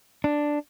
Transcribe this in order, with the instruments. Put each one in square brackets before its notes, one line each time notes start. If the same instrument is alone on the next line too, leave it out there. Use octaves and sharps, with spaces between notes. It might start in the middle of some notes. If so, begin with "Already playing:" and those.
[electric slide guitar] D4